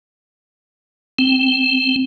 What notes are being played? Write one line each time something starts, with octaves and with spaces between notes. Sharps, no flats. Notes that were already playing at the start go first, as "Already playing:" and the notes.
C4